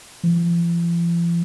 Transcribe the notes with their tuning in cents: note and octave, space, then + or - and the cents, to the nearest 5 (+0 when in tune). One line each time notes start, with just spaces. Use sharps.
F3 -45